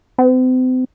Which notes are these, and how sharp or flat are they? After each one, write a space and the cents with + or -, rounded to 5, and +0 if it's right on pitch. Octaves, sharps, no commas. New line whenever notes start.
C4 -40